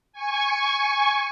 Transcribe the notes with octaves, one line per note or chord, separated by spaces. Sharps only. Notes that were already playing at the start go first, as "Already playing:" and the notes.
G#5 C#6